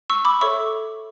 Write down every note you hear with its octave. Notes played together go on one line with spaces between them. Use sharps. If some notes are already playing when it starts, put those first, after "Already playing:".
C#6 E6
B5 D6
A4 C#5 E5 C#6 E6